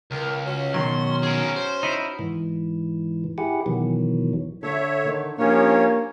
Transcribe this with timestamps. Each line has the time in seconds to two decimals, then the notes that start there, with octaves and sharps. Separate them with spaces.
0.11 C#2 A#4
0.46 C#4 F#4
0.74 B2 D#3 F#3 C6
1.23 G#4 A#4
1.56 C5
1.83 D#4 E4
2.19 G#2 E3
3.38 E4 G4 G#4 F#5
3.66 B2 D#3 E3 F#3
4.63 D3 A4 C#5 E5
5.04 D#3 D#4
5.38 F3 A#3 C#4 D4 G4 C#5